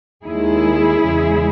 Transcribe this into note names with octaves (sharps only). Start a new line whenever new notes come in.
D#2 D#3 G#3 E4 G#4
E2 C#3 G#3